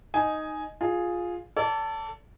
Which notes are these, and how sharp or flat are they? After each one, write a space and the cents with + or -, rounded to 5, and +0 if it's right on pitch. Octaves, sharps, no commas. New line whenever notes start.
D#4 +0 G#5 +5
F4 +10 G#4 +0
A4 +15 D5 -35